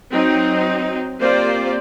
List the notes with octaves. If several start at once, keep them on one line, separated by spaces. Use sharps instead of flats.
F#3 C4 D#4
A#3 C4 F4 G4 C5 D5